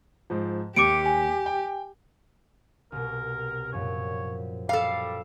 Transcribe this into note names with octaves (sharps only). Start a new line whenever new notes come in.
G#2 F3
D#2 G4 D6 C#7 D7
G#5
G5
C2 B2 A#4
F#2 A#2 F3 C#5
G3 A4 F5